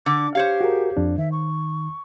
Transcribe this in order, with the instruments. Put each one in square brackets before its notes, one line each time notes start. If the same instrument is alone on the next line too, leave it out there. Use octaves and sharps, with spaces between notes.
[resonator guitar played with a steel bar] D3 [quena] D6
[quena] G4 [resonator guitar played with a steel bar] C5 C#5 F5
[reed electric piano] F#4 G#4 A#4
F2 D4
[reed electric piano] D#3 [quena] E5
[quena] C#6